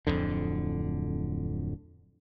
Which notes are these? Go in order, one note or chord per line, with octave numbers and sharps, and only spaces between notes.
D1 B1 F2 D3